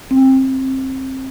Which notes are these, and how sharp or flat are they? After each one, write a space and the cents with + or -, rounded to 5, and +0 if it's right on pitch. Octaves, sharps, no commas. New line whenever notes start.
C4 +20